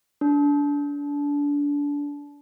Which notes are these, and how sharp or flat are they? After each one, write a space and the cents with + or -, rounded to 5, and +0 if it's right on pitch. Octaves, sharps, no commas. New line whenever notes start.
D4 -30